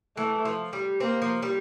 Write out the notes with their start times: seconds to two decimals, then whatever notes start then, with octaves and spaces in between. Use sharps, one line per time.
0.17 E3 A3
0.45 F3
0.73 G3
1.00 A#3 C4
1.22 F3
1.42 G3